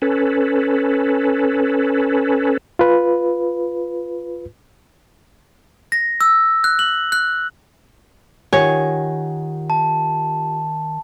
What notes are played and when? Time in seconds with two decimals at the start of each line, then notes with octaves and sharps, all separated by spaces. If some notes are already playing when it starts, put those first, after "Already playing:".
0.02 C#4 A4 B4
2.79 F4 B4
5.92 A#6
6.21 E6
6.64 F#6
6.79 F#7
7.12 F#6
8.53 D#3 F4 G4 C#5 F#5 G#5
9.70 A5